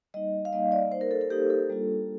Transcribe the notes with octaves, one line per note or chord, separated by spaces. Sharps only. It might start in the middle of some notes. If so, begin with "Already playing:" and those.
G3 A#3 D#4 D#5
F5
G3 A#3 D#4 D#5
D5
A#3 D#4 C5
A#4
A4
A4
A#3 D#4 G4
A4
G3 A#3 D4 F4